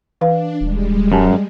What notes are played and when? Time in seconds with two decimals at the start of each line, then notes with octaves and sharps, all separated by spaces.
0.21 E3 D4 B4 F5
0.61 D#1 G3 G#3
1.12 F#2 G4 G#5 A5